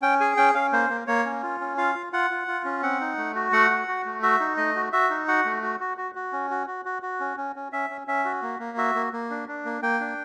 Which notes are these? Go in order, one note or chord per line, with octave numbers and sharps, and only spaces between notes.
C#4 G5
G#4 G#5
C#4 G5
C#4 F5
A#3 C5
A#3
A#3 C#5
C#4
F4
C#4
F4 F5
F4
F4 F#5
F4
F4
C#4
C4 F#5
D#4
A3
F#4
A3 F#5
F#4
F#4
A3
F#4 E5
D#4
A3 D#5
F#4
F#4 E5
D#4
F#4 F#5
A3
F#4
F#4
F#4
F#4
C#4
F#4
F#4
F#4
F#4
C#4
C#4
C#4
C#4 E5
C#4
C#4 E5
F#4
A#3
A#3
F#4 E5
A#3
A#3
D4
D4
A#3
A#3 G5
D4